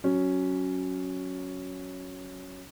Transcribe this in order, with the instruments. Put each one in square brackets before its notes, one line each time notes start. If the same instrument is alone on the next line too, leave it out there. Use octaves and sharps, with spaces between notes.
[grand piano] F#3 C#4